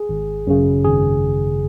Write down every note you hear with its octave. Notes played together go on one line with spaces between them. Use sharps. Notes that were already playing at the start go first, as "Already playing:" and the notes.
Already playing: G#4
G#1
F#2 C#3
G#1 G#4